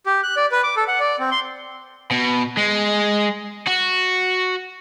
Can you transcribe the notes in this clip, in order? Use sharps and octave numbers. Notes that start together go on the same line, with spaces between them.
G4
F#6
D5
B4
D6
A4
F#5
D5
C4
C6
B2
G#3
F#4